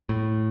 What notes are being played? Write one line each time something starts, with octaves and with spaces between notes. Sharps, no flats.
A2